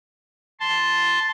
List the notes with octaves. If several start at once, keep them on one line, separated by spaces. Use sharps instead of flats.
A5 C6